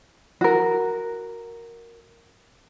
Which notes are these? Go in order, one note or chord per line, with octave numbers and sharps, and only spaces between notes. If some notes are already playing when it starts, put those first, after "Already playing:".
F#4 A#4